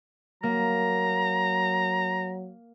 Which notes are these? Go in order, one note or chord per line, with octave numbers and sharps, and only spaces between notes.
F#3 A#3 A#5